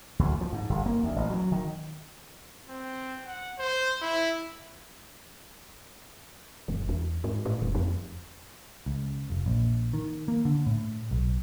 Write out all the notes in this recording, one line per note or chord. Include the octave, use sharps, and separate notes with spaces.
D2
F3
G#2
G1
A#3
D2
A1
F#3
D#3
C4
F#5
C5
E4
F#1
E2
G#2
A2
F1
F2
C#2
F1
A#1
D#3
A#3
D3
A2
B1